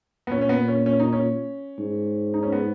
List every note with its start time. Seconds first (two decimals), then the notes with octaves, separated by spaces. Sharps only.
0.27 B3
0.31 A#2 C#4
0.41 C#4
0.49 B3
0.68 C#4
0.86 C#4
1.00 D#4
1.13 C#4
1.79 G#2
2.34 D#4
2.43 C#4
2.52 B3